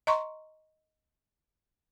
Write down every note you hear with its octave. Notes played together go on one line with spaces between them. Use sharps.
D#5 A#5 C6 C#6